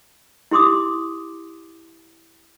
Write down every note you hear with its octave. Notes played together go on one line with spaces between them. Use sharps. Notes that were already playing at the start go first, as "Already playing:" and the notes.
E4 G4 C6 D6 D#6